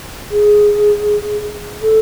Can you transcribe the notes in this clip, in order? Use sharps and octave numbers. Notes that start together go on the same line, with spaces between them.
G#4
A4